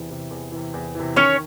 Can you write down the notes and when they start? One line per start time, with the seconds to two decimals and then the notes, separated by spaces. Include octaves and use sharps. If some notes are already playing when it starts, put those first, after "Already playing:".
Already playing: E2 C3 E3
0.10 C3 E3
0.31 E2
0.52 C3 E3
0.74 E2
0.95 C3 E3
1.16 D#3 C#4 C#5